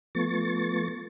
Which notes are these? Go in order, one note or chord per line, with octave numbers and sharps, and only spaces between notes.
F3 A3 B3 C#6 A6